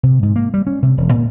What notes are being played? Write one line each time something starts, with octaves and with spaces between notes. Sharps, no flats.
C3
G#2
A#3
G3
C#4
C3
E1
A#2